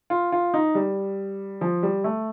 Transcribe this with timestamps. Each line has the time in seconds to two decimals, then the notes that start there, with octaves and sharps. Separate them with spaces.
0.10 F4
0.32 F4
0.54 D#4
0.75 G3
1.61 F3
1.83 G3
2.04 A3